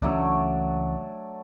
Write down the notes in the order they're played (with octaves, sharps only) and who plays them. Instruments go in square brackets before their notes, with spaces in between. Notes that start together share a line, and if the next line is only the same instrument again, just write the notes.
[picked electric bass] C#2 E3 C#4 [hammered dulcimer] F#3 A3 D4